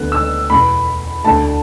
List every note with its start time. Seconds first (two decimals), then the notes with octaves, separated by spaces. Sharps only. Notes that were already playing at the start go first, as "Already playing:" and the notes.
Already playing: D2 D3 B3 F#6
0.12 E6
0.50 E2 B2 B3 B5
1.24 D2 D3 A3 A5